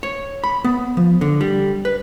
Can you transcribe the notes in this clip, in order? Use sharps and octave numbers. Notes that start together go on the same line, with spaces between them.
C#5
B5
B3
F3
D3
G3
B4